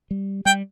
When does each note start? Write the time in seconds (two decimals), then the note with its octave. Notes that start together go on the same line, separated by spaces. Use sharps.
0.11 G3
0.46 G3 G5